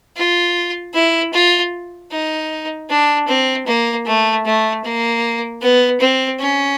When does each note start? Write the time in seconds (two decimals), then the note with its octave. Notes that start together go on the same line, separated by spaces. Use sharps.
0.16 F4
0.94 E4
1.33 F4
2.11 D#4
2.90 D4
3.28 C4
3.67 A#3
4.06 A3
4.45 A3
4.85 A#3
5.62 B3
6.00 C4
6.40 C#4